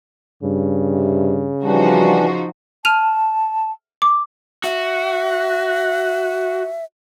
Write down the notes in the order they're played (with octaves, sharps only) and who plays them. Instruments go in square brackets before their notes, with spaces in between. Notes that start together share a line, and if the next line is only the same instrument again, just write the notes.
[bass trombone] G2 [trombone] C#3
[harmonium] C3
[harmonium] E3 D4 [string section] F3 D#4 F#4 [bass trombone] G3
[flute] A5 [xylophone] F6 D#7 F7
[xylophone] D6
[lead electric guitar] F#4 [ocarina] E5